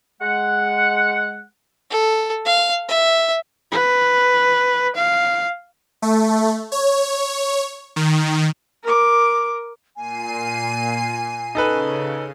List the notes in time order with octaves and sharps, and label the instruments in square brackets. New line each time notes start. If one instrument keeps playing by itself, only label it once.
[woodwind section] G#3 F#5
[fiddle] A4
F5
E5
[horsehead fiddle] B4
F5
[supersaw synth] A3
C#5
D#3
[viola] A#4 D6
[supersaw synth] A#2 C7 D#7 [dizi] G#5
[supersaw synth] C#3 [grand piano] D#4 A4 B4